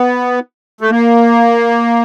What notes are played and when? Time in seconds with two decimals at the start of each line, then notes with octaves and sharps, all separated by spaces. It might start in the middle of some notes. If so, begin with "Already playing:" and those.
Already playing: B3
0.81 A3
0.90 A#3